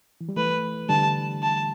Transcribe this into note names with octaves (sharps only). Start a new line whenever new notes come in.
E3
G3
E3 A3 B4
D3 G3 A5
A5